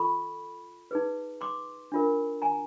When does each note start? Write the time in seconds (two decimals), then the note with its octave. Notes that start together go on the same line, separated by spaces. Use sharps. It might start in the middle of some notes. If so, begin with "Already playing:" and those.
Already playing: F4 A4 B5 C#6
0.91 D#4 G#4 B4
1.41 C6 D6
1.92 D4 F4 A#4
2.42 G#5 A#5